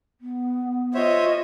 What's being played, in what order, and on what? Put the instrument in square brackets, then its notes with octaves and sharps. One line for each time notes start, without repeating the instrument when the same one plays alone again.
[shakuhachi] B3
[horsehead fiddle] F4 D#5 [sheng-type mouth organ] C5 C#5 E5